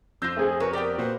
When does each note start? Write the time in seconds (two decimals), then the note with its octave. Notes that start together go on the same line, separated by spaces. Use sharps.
0.22 F2 D4 F4 E6 G6 A#6
0.37 A3 C4 G#4
0.60 F#4 A#4 B4 C#5
0.73 B3 G4 A4 D5 G5
0.98 A#2 F#4 B4 C5